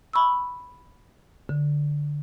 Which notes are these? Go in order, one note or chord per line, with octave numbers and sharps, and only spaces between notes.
B5 C#6 E6
D3